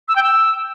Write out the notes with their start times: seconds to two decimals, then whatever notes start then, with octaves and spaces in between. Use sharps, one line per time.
0.08 E6
0.15 G5
0.23 E6